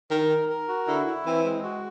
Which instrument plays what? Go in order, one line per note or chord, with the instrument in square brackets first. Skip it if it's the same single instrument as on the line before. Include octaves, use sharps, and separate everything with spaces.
[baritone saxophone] D#3 [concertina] A#4
[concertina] A#4
A#4
F#4
[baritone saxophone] D3 [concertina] E4
[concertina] E4
[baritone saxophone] E3 [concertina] C4
[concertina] G#3
F#4